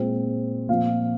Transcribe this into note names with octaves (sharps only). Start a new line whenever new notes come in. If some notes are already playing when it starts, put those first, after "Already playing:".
Already playing: A#2 G#3 C4
A#2 F3 C4 F5